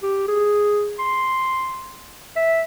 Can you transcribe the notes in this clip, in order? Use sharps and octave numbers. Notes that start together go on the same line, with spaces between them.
G4
G#4
C6
E5